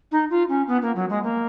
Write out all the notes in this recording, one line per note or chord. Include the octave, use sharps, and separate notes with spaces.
D#4
F4
C#4
B3
A#3
F#3
G#3
A#3